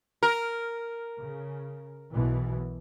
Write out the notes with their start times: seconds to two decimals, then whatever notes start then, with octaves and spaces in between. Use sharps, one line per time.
0.23 A#4
1.18 C#3
2.13 B1 B2 E3